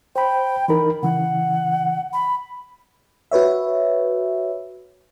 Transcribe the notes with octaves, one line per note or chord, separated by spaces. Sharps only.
C5 G5 B5
E3 D#4 A#4 B5
C#3 E3 F#5
B5
F#4 B4 C#5 E5